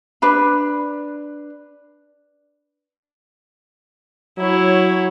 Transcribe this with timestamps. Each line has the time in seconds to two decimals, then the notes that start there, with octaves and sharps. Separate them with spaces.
0.22 D4 B4 B5
4.38 F#3 E4 C#5